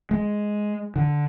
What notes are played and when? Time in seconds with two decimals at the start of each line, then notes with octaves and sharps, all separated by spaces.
0.11 G#3
0.96 D3